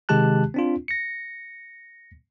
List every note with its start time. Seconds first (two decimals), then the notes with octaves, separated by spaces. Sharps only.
0.09 C3 D#3 G#3 G4 A5 F#6
0.54 C4 D4 F4
0.88 A#6 C#7